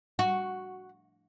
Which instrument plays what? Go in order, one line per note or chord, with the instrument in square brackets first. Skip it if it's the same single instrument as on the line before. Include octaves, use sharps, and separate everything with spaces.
[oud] F#4